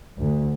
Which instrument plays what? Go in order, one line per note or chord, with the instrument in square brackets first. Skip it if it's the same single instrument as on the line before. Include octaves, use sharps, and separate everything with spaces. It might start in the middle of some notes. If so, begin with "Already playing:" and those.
[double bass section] D2